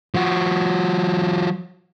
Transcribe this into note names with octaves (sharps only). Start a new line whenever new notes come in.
F3 F#4